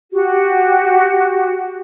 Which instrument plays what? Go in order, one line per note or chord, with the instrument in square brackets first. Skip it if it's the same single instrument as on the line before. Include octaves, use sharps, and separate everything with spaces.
[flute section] F#4 G4